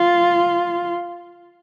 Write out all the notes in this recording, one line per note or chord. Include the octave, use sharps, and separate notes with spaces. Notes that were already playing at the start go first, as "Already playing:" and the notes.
Already playing: F4